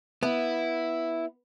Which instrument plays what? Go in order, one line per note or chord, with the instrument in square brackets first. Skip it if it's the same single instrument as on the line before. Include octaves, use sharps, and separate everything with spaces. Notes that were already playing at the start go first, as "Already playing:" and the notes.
[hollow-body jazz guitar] B3 [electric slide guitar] E4